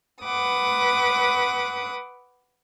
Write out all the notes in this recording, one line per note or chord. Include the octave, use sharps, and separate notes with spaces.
B4 F#5 D6 D#6